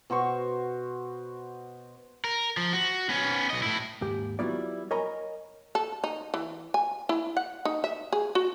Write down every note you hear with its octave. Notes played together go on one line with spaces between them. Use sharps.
B2 F#4 C5 C#6
A#4
F3
F#4
B3 C#4
B1 D#5
A2 E4
D#2 G#2 G4
F#3 G3 B3 E4 F4 D5
A#4 C#5 D#5 G#5 A#5 B5
A4
D#4
E3
G#5
E4
F#5
D#4
E5
G#4
F#4